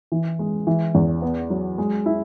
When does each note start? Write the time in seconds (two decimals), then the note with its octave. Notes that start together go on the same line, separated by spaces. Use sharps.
0.12 E3
0.39 G#3
0.67 E3
0.95 E2
1.22 B3
1.50 F#3
1.78 G#3
2.06 E4